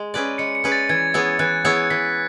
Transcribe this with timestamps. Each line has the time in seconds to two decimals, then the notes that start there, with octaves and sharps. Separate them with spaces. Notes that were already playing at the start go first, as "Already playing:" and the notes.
Already playing: G#3
0.14 C#4 G#4 B4 D5
0.38 G#3 C#7
0.55 C#7
0.64 C#4 G#4 B4 D5
0.72 A6
0.89 E3 G#6
1.14 B3 E4 G#4 C#5
1.39 E3 F#6
1.65 B3 E4 G#4 C#5 C#7
1.90 E3 B6